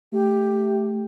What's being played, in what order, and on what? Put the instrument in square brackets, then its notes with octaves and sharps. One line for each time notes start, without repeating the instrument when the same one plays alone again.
[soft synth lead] A3 [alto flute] G4